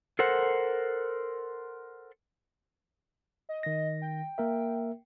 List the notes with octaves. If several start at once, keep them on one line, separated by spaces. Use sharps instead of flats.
A4 A#4 C5 F#5
D#5
D#3 A#6
G5
A#3 A#4 E5